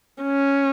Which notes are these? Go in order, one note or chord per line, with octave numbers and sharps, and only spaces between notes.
C#4